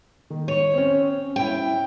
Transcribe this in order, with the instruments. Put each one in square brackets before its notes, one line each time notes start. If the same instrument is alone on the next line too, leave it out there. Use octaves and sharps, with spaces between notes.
[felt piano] D#3
[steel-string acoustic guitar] C#5
[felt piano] C4 C#4
[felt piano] C#4 E4 [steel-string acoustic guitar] G5